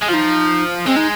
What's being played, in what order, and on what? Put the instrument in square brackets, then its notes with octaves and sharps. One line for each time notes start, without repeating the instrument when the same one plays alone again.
[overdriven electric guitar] G#3
[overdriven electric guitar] F3 [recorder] D#4 F4
[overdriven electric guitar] G#3 [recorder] C4
[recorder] D#4